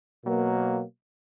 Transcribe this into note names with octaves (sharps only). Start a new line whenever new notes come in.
B2 F#3 A#3